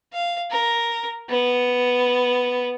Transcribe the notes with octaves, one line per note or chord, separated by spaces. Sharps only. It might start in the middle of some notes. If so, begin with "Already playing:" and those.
F5
A#4
B3